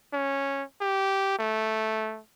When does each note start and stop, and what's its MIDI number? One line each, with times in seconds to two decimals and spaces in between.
0.13 0.63 61
0.81 1.35 67
1.39 2.20 57